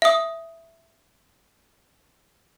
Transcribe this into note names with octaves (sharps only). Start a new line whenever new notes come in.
E5 D#6